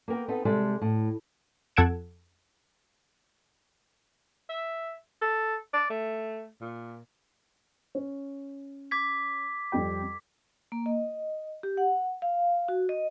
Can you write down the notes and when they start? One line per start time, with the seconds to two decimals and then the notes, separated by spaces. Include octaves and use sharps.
0.08 A#3 B3 A#4 G5
0.28 B3 C4 D#4 A4
0.45 C3 G3 G#3 A4
0.82 A2
1.77 F2 A4 F#5 G#6 D7 E7
4.50 E5
5.22 A4
5.74 D5
5.90 A3
6.61 A#2
7.95 C#4
8.91 D6 G#6 B6
9.72 F2 G3 G5
10.72 A#3
10.86 D#5
11.63 G4
11.77 F#5
12.22 F5
12.68 F#4
12.89 D#5